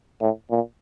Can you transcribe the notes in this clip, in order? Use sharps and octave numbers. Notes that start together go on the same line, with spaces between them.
A2
A#2